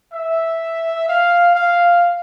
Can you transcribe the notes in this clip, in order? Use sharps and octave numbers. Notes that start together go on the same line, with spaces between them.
E5
F5
F5